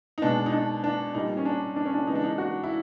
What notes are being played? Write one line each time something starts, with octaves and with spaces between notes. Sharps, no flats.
D#4
B2 G#3 B3 D4
D#4
D4
D4
A#2 G3 A#3 D#4
C#4
D4
D4
C#4
D4
C#3 E3 G#3 B3 D#4
D4
D#4
F#4
E4